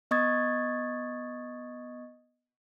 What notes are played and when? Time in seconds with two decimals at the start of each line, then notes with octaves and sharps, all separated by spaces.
0.11 B3 D#5 C#6 D#6 G#6 A6